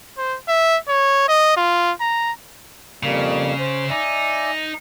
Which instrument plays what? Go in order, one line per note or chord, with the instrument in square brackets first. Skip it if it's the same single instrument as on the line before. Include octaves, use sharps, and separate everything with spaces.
[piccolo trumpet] C5
E5
C#5
D#5
F4
A#5
[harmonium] F2 G3 A#3 [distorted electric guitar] C#3
[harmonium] C5
[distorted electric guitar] D#4 [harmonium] D5 E5 G#5